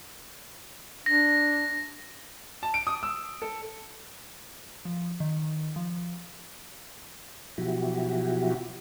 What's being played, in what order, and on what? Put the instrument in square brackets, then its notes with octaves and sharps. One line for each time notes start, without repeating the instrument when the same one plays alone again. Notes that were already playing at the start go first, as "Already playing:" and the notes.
[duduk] D4 [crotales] A#6
[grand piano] A5
D7
D#6
E6
A4
[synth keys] F3
D#3
F3
[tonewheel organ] B2 F3 F#3 E4 F#4 G4